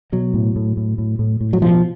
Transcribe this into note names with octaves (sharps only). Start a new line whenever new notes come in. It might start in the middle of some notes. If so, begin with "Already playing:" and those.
B2 F#3
A2
A2
A2
A2
A2
A2
F#3
B2 F3